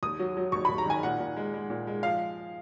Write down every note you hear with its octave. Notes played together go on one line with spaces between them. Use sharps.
D#2 D#6
F#3
F#3
D#2 C#6
B5
D#2
A#5
D#3 G#5
A#2 F#5
A#2
G#3
G#3
A#2
G#3
F3 F5